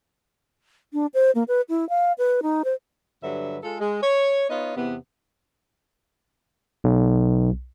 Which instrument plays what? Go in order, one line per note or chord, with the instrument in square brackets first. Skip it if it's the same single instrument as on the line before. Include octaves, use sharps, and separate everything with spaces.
[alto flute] D4
C5
A#3
B4
E4
F5
B4
D#4
C5
[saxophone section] G2 D3 F#3 B4 E5
G#3 F4 A4
G#3
C#5
B3 D#4 F4 C#5 D#5
E2 C3 B3
[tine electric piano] B1